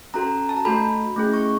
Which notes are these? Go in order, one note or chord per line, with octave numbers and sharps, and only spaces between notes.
C#4 F#4 A4 A#5
A5
A#5
A3 D4 F#4 A4 B5
A3 C#4 E4 G#4
C#6